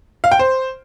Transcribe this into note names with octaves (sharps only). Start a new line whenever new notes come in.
F5
G5
C5